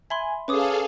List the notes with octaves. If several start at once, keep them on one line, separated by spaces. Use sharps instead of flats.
E5 G#5 B5 C6
C#4 G#4 A4 B4 F5 D6 D#6